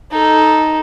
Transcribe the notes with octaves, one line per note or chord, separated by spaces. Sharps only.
D#4 A4